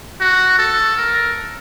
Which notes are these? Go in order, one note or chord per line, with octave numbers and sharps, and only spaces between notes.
F#4
A4
A#4